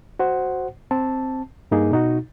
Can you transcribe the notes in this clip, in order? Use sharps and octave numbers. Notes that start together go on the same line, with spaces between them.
F#4 C5 F#5
C4 A5
G2 A#3 D#4 G#4
B2 D#4 F#4